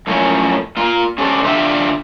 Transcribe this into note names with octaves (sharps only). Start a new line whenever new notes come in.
F#2 A2 F3 A#3 C4 C#4
A#3 F4
C#4 G4 A4 C5 D5
D3 D4 F4 G4 E5